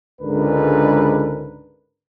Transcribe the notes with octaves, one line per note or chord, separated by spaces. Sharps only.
C#2 G#2 D3 D4 A#4 B4